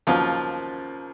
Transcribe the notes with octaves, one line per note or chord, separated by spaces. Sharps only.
D#2 C#3 F3 F#3 F4